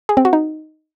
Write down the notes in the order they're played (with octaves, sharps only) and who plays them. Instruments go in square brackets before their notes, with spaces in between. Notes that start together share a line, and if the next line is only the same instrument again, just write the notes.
[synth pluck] G#4
C4
F#4
D#4